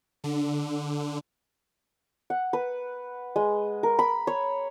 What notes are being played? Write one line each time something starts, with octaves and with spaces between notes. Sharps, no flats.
D3
F#5
B4
G#3
A#4
B5
C#5